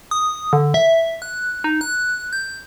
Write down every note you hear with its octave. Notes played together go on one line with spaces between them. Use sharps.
D#6
D3
E5
F#6
D#4
F#6
G6